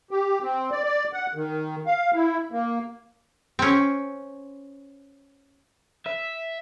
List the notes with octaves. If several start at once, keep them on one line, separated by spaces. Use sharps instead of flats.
G4
C4
D5
D5
F#5
D#3
F5
E4
A#3
C4 C#4
E5